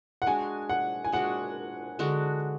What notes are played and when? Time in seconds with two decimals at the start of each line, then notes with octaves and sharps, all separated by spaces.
0.22 F#5
0.26 G#3 D4 F#4 G#5
0.69 F#5
1.05 G#5
1.12 G#3 D4 F#4 F#5
1.99 D3 G#3 D4 F#4